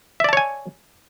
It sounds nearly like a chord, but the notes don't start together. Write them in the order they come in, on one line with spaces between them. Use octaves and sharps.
E5 D5 A5 C#5 G#5